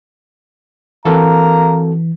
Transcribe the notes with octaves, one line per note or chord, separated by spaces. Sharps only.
E3 A#3 C4 F#4 A4 A#5